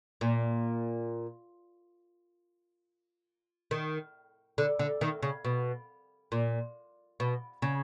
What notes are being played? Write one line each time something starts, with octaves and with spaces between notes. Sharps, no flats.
A#2
D#3
D3
D3
D#3
C#3
B2
A#2
B2
C#3